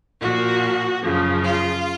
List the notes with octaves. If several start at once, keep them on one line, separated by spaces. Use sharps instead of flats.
A#2 F3 F#4
F#2 C#3 F3
F4